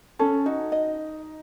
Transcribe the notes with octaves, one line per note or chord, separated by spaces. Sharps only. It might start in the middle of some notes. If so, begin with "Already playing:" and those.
C#4 A4
D#4 F#4
D#5